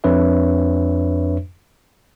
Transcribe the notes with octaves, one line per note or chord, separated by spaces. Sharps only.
F2 D4 B4 C#5 E5